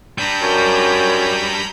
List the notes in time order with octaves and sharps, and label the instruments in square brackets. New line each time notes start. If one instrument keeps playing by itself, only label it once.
[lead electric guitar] G3 D4 [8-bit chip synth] A#5 B5 G6
[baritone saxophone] F#2